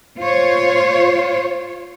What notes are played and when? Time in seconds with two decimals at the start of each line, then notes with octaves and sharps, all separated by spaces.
0.19 F4 C5 C#5